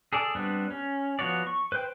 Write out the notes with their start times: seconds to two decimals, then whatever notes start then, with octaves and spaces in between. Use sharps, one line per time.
0.13 G#4 A4 D5
0.35 G3 B3 C4 D4
0.71 C#4
1.19 F3 B3 F#4 C#5 D5
1.47 C#6
1.72 B4 C5 G5